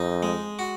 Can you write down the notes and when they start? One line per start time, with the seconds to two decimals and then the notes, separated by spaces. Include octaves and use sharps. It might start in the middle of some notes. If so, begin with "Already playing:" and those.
Already playing: F2 D#4
0.23 G#3
0.59 F#4